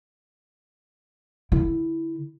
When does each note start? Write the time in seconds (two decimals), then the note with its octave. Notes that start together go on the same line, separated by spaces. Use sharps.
1.52 D3 E4